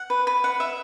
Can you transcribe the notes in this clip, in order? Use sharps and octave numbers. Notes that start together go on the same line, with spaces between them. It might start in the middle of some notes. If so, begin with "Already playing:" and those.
Already playing: F#5
B4
B4
F#5
E5